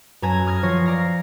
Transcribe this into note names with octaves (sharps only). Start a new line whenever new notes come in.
F#2 A4 B4 G#5 A#5 G#6
D#6 F6 G#6 A#6
F3 C#5 A#6 C7
D5 F5 A#5 A#6